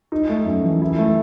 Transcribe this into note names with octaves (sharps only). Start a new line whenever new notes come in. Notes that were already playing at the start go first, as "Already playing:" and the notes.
D#4
A3
F#2
E3
E4
A3